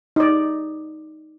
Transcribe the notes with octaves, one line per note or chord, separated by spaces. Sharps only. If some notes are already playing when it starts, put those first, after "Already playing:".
D#4 D5